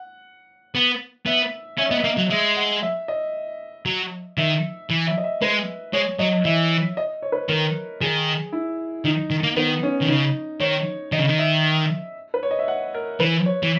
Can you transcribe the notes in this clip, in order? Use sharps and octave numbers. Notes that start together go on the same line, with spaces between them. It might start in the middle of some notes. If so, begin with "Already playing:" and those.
Already playing: F#5
B3
B3 E5
C#4 E5
B3 D#5
E5
A#3
F#3
G#3 E5
F#5
E5
D#5
F#3
D#3 E5
E3
E5
D#5
E5
G#3 B4
G#3 C#5
F#3 D#5
E3 E5
D#5
C#5
B4
D#3 A#4
D#3 G#4
E4
D#3 D#4
D#3
A#3
D#3 B3
C#4
D#3
C#3 D#4
D#3 C#5
D#3 D#5
C#3
D#3
E5
B4
C#5
D#5
E5
F#5
A#4
E3 B4
C#5
E3